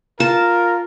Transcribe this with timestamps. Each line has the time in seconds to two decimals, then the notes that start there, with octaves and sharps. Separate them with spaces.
0.20 F4 A#4 A5